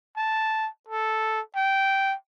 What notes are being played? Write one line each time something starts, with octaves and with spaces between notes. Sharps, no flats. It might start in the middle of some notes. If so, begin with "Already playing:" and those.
A5
A4
G5